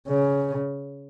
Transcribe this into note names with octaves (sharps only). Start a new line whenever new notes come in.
C#3